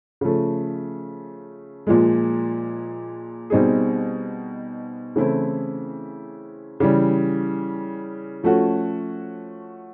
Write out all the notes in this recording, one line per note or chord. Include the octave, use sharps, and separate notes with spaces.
C#3 F3 A3
A#2 F3 G#3
B2 G3 C4 D#4 G#4
C#3 E3 A3 C4 E4
C#3 E3 G3
F3 A3 C#4 F#4